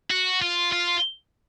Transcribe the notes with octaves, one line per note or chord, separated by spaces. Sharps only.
F#4
F4
F4